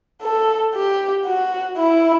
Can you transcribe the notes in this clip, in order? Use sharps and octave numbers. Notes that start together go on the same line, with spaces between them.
A4
G4
F#4
E4